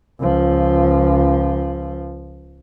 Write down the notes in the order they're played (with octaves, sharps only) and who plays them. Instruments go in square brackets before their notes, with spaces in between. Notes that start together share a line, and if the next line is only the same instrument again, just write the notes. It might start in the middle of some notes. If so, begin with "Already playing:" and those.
[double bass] C#2 F3